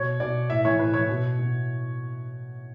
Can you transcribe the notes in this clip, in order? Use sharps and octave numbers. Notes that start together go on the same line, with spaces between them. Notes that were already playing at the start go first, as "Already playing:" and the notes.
Already playing: B2 C#5
B2 D5
A2 E5
E3 C#5
A2 B4
E3 C#5
B2
B2